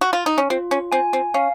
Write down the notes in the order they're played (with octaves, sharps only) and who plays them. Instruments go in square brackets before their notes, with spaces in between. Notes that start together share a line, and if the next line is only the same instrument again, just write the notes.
[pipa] F#4
F4
D#4
C#4
[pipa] C4 [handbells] F4
[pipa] C#4
[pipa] C4 [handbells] G#5
[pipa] C4
[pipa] C#4 [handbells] F5